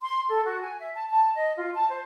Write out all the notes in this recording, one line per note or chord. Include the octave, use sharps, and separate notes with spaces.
C6
A4
F#4
G#5
E5
A5
A5
D#5
F4
A5
C5